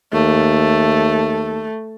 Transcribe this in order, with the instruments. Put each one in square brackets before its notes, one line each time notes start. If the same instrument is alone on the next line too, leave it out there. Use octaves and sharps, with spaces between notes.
[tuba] D#2 [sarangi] A3